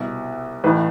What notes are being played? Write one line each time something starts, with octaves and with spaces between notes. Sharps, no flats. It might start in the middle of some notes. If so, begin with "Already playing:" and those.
Already playing: C2 B2
A1 A2 E3 B4